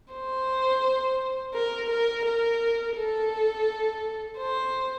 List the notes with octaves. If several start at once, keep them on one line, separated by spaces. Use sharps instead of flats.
C5
A#4
A#4
A#4
A4
C5